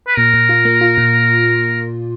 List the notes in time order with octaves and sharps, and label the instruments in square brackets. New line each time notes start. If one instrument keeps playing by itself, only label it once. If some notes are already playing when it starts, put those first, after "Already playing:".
[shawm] B4
[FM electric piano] A#2 [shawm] A#4
[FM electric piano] A#2
F4
A#3
F4
A#2